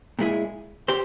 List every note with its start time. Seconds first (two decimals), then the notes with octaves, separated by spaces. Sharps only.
0.19 A#2 G#3 E4 G#4
0.89 G4 C5